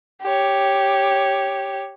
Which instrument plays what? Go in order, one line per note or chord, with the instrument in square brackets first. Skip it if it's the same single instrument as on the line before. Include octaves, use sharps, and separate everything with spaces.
[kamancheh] G4 C#5